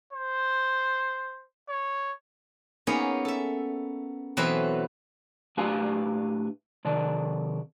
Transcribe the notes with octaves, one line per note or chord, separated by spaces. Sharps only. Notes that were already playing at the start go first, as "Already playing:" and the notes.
C5
C#5
A#3 B3 C#4 D#4 G#4
A4 E5
B2 E3 F#3 C4 A4 B4
A2 D4 G4 B4 F5 G#5
C3 D#3 D5